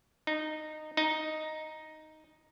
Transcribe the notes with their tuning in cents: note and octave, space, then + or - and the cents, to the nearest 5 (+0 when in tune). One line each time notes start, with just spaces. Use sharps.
D#4 -15
D#4 +0